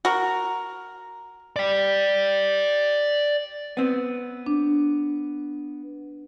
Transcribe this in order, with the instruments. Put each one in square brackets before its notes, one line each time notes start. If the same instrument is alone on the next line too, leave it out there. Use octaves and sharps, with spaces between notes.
[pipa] F#4 A#4
[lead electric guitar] D5 G5
[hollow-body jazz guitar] B3 C4
[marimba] D4